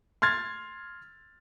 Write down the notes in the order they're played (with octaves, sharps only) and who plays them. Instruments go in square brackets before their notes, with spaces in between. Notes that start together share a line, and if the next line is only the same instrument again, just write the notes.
[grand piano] C6 F6 G#6 A6